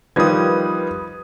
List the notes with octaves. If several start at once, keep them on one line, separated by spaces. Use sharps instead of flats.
D#3 F3 G3 B4 D#6 G#6